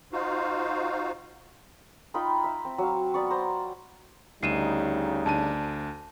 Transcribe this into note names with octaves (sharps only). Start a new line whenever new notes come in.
D#4 F4 F#4 C5 F5
D#4 F4 G5 B5
E5
C4
F#3 F5
B3 D5 C#6
C5 A#5
D2 C#3 G3 D#4 C7 D#7 E7
D2 D4 A5 D#7